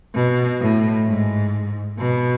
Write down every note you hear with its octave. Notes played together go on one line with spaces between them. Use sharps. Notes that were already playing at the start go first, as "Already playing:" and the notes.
B2
A2
G#2
B2